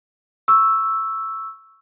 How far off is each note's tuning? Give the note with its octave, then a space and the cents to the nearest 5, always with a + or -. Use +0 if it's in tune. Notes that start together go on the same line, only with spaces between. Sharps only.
C#6 +0 E6 +0